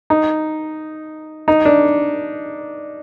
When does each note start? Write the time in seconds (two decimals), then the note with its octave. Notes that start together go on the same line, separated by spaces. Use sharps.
0.10 D#4
1.48 D#4
1.65 D4